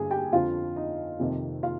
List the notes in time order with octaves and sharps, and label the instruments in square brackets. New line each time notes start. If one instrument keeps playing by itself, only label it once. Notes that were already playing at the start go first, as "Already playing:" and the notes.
Already playing: [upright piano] G2 D3 G#4 G#5
G4 G5
F2 D3 F3 F4 F5
D#4 D#5
F2 C3 D#3
F4 F5